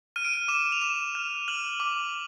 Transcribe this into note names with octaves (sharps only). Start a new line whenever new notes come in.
F6 D#7
D7
D#7
D6 E7
F7
D6 E7
F6
F6 F#7
D6